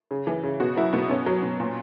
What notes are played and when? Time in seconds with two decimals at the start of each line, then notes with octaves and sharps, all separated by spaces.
0.11 C#3
0.27 E3
0.44 C#3
0.60 B2 F#4
0.77 F#3 E4
0.93 B2 B3
1.10 B2 C#4
1.26 F#3
1.43 B2
1.60 A#2